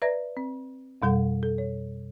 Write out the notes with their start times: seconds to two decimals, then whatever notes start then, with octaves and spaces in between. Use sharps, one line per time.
0.02 B4 D5 E5 A#5 G#6 A#6
0.37 C4
1.02 F2 B2 G3 A4 F#5
1.43 A4
1.58 C#5